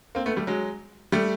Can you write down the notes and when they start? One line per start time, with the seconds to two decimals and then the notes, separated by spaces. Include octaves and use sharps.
0.15 A#3 C4
0.26 A3 B3
0.36 G3 A3
0.47 F#3 G#3
1.12 G3 A3